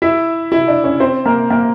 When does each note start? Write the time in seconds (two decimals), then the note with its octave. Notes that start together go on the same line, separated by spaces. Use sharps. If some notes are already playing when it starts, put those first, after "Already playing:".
0.02 E4 E5
0.52 E4 E5
0.68 D4 D5
0.84 C#4 C#5
1.00 C4 C5
1.25 A#3 A#4
1.50 A#3 A#4